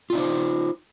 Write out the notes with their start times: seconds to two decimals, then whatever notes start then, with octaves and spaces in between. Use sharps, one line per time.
0.10 F4
0.13 D5
0.15 D#4
0.18 C5